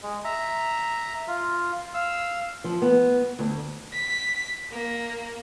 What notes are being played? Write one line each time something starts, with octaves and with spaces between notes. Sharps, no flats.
G#3
E5 A#5
F4
F5 E6
F3
B3
D2
B6
A#3